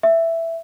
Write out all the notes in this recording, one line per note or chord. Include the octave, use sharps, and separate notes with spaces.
E5